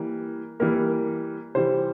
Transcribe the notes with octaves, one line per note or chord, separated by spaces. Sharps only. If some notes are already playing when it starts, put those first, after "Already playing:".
Already playing: E3 G3 A#3
E3 G3 A#3 A#4
C3 E3 G3 C5